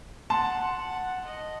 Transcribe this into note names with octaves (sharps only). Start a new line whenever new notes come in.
F#5 A5 C6
F#5
D#5